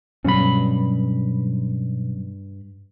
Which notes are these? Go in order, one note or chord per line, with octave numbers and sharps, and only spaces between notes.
G2 B2 F#3 C#4 B5